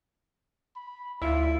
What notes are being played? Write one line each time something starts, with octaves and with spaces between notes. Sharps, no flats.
B5
D2 E4 F4 E5